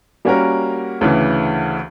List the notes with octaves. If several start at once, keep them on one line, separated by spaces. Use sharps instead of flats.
G3 A#3 C#4 F#4 A#4
D2 C#3 E3